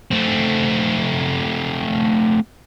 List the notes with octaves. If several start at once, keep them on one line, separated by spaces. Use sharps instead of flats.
A3 C4